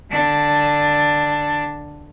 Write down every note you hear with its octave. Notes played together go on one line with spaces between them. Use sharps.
D3 D4